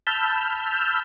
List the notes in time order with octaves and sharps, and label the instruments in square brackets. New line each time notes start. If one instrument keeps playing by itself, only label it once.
[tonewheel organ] A5 B5 E6 F6 G6